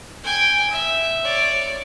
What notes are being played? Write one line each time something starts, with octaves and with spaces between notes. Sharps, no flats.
G5 G#5
E5
C#5 D5